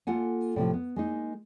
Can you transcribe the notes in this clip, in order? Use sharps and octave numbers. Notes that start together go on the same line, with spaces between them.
A#3 F4 A4 F#5 G#5
A2 C3 F3
B3
G#3 A#3 D#4